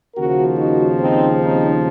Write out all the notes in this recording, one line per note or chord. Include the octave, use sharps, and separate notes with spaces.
D#2 C#3 F3 F#4 A#4
D#4 F#4
C4 D#4
C4 D#4